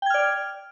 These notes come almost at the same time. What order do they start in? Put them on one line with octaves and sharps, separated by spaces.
G5 G#6 F6 D5